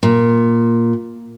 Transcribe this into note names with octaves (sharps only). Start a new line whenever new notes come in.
A#2